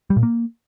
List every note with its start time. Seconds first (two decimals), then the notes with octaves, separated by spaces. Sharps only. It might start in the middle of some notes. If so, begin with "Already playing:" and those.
0.10 G3
0.17 A#2
0.23 A#3